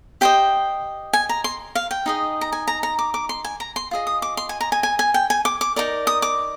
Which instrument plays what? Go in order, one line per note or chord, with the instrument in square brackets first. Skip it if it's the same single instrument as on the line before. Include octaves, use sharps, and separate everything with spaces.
[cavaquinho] G4 C5 D#5 G5
G#5
A#5
C6
F5
G5
D#4 G#4 D#5
A#5
G#5
A#5
A#5
D6
D6
C6
G#5
A#5
C6
F4 G#4 D#5
D#6
D6
C6
G#5
A#5
G#5
G#5
G#5
G5
G#5
D6
D6
D#4 A#4 D5
D#6
D6